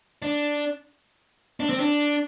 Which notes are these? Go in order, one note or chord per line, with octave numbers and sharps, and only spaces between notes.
D4
D4
C4
D4